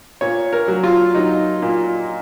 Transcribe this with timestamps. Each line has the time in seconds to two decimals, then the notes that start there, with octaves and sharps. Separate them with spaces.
0.21 A#2 C#5
0.53 A#4
0.68 F#3
0.84 F4
1.14 F#3 D#4
1.62 A#2